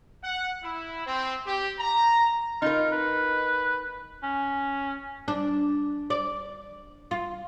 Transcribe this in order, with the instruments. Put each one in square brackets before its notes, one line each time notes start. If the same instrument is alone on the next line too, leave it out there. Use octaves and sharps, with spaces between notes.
[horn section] F#5
E4
C4
G4
A#5
[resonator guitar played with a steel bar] D#4 A#4 [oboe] F4
[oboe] B4
[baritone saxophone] C#4
[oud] D4
D5
F4